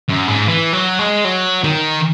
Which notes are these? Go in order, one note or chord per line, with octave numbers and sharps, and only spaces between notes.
F#2
G#2
E3
F#3
G#3
F#3
D#3